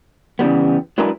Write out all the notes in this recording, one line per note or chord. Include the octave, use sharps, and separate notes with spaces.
C#3 E3 G3 B3
F#3 G#3 D4 E4 A#4 B4